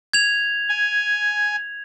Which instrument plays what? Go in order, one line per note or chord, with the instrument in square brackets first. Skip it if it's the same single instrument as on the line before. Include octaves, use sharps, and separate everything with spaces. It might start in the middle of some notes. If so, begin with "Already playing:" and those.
[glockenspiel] G#6 F7
[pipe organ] G#5